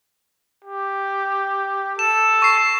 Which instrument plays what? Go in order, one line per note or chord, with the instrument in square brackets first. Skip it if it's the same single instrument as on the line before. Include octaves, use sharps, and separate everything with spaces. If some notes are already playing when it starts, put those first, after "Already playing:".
[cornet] G4
[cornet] A4 [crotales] E7
[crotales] C#6 C7